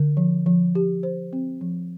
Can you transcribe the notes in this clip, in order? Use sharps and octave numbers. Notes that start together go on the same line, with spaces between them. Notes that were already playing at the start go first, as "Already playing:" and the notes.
Already playing: D3
F3
F3
G4
C5
C4
F3